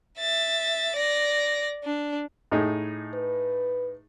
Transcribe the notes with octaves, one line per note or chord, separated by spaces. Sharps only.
E5 A6
D5 A#6
D4
A2 D#4 G#4
B4